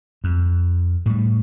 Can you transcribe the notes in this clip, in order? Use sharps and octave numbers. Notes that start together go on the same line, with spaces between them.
F2
A2 G3